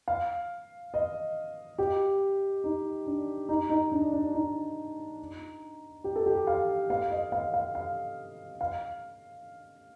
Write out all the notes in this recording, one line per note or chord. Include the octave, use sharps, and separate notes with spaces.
F5
D#5
G4
D#4
D4
D#4
D#4
D4
D4
D#4
G4
A4
G4
F5
F5
D#5
F5
F5
F5
F5